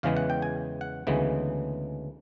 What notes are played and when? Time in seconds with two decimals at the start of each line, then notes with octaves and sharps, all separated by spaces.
0.03 E2 C#3 E3 G#3 B3 F5
0.17 F#5
0.30 G5
0.42 G#5
0.81 F#5
1.07 D2 C#3 E3 G#3 B3